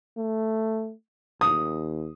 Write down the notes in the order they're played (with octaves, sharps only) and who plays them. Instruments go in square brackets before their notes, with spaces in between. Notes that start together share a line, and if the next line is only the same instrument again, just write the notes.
[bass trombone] A3
[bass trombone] D#2 [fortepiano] D#6